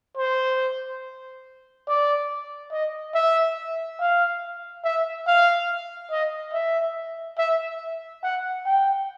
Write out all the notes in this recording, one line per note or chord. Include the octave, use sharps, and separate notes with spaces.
C5
D5
D#5
E5
F5
E5
F5
D#5
E5
E5
F#5
G5